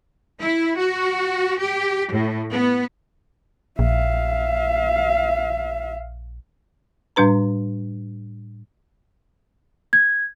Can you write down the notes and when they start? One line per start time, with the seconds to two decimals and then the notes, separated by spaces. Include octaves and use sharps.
0.41 E4
0.77 F#4
1.59 G4
2.12 A2
2.52 B3
3.79 A#1 E5 F5
7.16 A2 G3 D4 B4 A#5
9.93 G#6